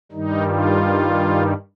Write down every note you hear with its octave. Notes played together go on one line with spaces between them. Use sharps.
G2 D#3 G3 D#4
F4